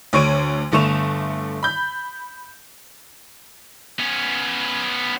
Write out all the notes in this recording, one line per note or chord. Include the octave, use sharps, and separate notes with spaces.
D2 D3 C#5 C#6 D7 D#7
G1 D3 A3 C#6 E7 F7
B5 G6
B3 C#4